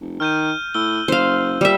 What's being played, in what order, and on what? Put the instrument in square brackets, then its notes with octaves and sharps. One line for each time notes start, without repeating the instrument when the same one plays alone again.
[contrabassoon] F1
[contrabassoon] D#3 [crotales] F6 G6 D#7
[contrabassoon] A2 [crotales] E6 G7
[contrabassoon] F#1 [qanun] C5 F5
[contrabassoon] A#2 [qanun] G3 E5